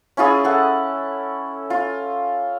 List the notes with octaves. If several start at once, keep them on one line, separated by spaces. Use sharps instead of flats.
C#4 E4 F4 G#4
A4 F#5
F4